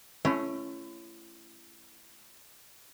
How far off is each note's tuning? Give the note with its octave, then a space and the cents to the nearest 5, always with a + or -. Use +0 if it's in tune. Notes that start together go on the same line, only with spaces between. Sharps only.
A3 -5 C#4 +0 E4 +40